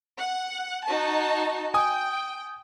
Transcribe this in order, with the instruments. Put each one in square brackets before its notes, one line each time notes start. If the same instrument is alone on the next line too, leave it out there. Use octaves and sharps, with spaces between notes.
[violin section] F#5
D#4 F#4 A5
[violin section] G5 [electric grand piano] G#5 D#6